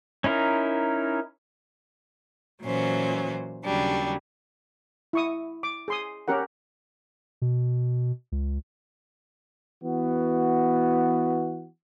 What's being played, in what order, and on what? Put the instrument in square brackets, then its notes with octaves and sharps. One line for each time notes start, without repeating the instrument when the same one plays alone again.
[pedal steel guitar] C#4 D#4 E4 A#4
[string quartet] A#2 E3 F#3 C#4 C5
D#2 C#3 F#3 G3 D4
[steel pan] E4 C#6 D#6
D6
G#4 C6 D#6
C#4 G4 A#4 F#5
[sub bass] B2
C#2
[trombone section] E3 B3 F#4